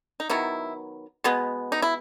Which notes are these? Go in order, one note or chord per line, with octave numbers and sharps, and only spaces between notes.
D#4
D#3 F#3 B3 E4
B2 G#3 B3
D#4
E4